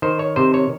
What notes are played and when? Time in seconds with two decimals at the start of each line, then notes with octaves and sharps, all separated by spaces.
0.02 D#3 C5
0.19 C#5
0.36 C3 C5
0.54 C#5